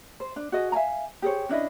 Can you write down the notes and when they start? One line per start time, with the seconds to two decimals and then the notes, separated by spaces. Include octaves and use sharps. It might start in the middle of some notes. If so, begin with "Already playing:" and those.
0.20 C5
0.36 D4
0.52 F#4 G#4 D#5
0.72 E5 F5 G#5 A#5
1.22 G4 G#4 C5 C#5
1.49 C#4 D4 E4 D#5